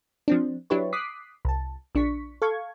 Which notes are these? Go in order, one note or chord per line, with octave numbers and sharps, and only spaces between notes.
F3 C4 D4
F#3 D4 E4 G4 B4 C#5
D6 D#6 F#6 B6 C7
C2 A5
A#1 D4 C#6 B6
A4 F5 C#6 G#6